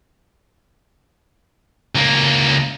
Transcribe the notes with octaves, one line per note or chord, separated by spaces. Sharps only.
C#2 A#3